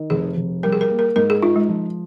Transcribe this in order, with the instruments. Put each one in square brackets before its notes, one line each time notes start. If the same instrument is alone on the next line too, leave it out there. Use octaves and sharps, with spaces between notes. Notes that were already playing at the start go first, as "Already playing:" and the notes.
Already playing: [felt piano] D#3
[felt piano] F1 [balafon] G#4
[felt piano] F1
[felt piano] G3 [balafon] A#4
[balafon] G#4
A#4
[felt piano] A#3
[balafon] A#4
[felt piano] G#2 [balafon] A#4
[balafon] G#4
[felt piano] D#4 [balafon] F4
[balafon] G#3
[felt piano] F3